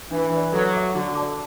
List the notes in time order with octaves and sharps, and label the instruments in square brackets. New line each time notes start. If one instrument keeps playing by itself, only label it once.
[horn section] E3 [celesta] D4
[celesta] B4 D5
[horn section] F#3 [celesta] A4
[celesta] E5 D6
[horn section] D3 [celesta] F#4
[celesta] D5 A5 D6